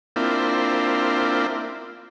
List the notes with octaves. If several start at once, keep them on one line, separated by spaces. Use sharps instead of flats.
A#3 C4 D4 E4 F4